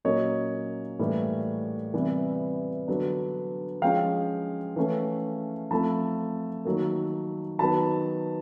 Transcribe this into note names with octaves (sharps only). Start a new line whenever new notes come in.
A#2 F#3 A#3 C#4 C#5 D#5
A2 E3 G3 A#3
C3 E3 G3 B3
D3 F#3 B3 D4
F3 G#3 C#4 F5 G5
E3 A3 C#4
F3 A3 C4 A5 B5
D#3 F#3 A#3
D#3 F#3 B3 A5 B5